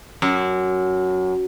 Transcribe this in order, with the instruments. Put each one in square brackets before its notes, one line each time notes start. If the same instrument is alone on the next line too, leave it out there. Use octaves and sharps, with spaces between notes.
[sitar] F#2